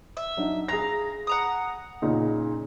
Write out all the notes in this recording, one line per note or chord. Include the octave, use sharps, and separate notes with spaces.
E5
F#3 D4 D#4
G#4 F5 A#5 A#6
F#5 A#5 D#6
A#2 C#3 D#4